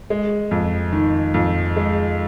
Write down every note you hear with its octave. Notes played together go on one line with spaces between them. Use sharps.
G#3
F2
D#3
F2
G#3